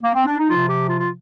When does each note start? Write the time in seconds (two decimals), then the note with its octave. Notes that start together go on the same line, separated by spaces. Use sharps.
0.02 A#3
0.14 C4
0.26 D4
0.38 D#4
0.50 C3 F3 F4
0.70 G4
0.89 F4
1.00 F4